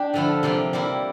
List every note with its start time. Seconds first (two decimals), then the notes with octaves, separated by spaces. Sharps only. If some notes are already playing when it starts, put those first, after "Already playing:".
Already playing: D4 G4
0.14 D3 F3 A3 E4
0.43 C3 F3 A#3 F4
0.73 G3 A#3 E4 A#4